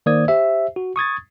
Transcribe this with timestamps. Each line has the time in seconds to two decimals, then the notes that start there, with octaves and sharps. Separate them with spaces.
0.06 D#3 A#3 C5 D5 D#6 G#6
0.28 G4 C5 E5
0.76 F#4
0.96 C#6 D#6 G#6 A6